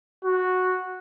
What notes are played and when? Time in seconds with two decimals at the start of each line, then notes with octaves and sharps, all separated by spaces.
0.24 F#4